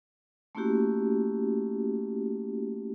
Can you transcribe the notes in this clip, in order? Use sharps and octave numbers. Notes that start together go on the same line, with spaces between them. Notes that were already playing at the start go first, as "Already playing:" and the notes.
A3 A#3 C#4 E4 F#4 G4